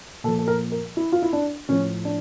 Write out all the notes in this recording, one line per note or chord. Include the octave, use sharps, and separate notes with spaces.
A#2 F3 A4
A4
A#4
A#4
E4
F4
E4
D4
A2 F3 C#4
D4